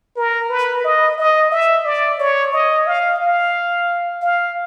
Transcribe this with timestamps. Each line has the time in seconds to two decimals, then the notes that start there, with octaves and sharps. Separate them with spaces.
0.16 A#4
0.49 B4
0.84 D#5
1.18 D#5
1.51 E5
1.85 D5
2.19 C#5
2.53 D#5
2.87 F5
3.20 F5
4.22 F5